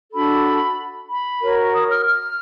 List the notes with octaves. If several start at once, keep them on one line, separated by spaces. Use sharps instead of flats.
D4 F#4 A4 B5
B5
F#4 A#4 C#5
D#6
F6
F6